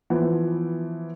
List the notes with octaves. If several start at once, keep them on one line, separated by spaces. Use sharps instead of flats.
E3 F3 B3